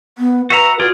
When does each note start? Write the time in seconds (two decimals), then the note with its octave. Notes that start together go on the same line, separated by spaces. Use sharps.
0.18 B3
0.50 F#4 B4 E5 A#5
0.80 F4 F#4 G#4 D5